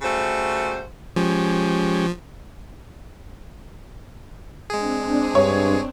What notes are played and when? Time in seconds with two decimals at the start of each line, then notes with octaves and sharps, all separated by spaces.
0.02 C#3 G3 A3 F#4 C5
1.16 F3 G#3 C#4 G4
4.70 G#3 C4 D4 G#4
5.35 G2 C#5